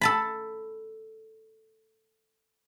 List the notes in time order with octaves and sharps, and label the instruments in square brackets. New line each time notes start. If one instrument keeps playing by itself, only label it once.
[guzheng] A4 A5 B5